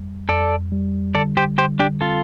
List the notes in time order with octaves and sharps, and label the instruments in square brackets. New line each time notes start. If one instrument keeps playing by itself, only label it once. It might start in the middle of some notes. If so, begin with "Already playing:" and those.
Already playing: [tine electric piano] F2 G3
[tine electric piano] F2 [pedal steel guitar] A4 D5
[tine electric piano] G3
[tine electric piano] D3 [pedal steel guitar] A4 D5
[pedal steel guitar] G4 C5
[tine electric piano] D3 [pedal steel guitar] G4 C5
[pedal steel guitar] D4 G4
[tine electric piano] C4 [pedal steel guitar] F4 A4